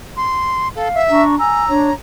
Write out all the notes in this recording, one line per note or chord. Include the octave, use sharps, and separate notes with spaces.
C6
A4 F5
E5
D4 A#5 C#6
G#5 A#5 E6
D4 C#5